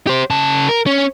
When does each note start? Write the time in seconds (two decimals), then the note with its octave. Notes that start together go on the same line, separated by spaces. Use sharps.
0.07 G4 C5
0.30 C#3 A5
0.69 A#4
0.86 C#4